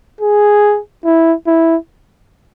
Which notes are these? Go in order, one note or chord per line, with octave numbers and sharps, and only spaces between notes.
G#4
E4
E4